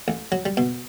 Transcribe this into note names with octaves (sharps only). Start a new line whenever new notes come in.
A1
F#3
G3
B2